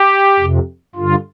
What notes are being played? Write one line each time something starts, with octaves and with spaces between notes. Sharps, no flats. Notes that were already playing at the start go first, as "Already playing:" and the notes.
Already playing: G4
F2 C3
G2 D3 F4